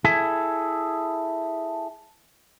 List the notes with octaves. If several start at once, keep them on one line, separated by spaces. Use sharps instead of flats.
E4 G#4 A4